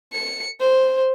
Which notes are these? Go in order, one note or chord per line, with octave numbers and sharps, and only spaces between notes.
C#7
C5